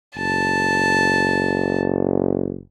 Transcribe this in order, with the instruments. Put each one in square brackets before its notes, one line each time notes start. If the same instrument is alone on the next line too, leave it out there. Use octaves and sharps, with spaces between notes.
[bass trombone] F#1 [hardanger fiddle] A5